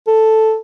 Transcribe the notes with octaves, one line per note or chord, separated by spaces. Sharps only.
A4